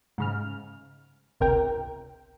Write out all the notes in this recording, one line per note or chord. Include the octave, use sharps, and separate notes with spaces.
G#2 C#3 F6
G1 C#2 C3 A#4 G5